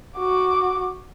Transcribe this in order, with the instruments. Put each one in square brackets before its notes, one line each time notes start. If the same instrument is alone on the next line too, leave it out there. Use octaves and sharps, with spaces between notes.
[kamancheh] F#4 D6